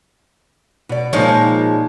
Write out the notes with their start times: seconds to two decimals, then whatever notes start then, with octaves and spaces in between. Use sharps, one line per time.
0.89 B2 D5
1.13 A#2 F3 G#3 D#4 C#5